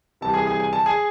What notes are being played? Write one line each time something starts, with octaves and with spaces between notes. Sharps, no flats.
C2 C3 E3 A5
G#4 G#5
G#4 G#5
G#5
A5
G#4 G#5